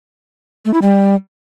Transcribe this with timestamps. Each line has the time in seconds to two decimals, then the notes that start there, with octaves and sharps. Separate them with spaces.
0.65 A3
0.74 E4
0.82 G3